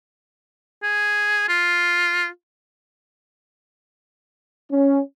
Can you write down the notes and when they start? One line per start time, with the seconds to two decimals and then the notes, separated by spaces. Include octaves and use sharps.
0.83 G#4
1.49 F4
4.71 C#4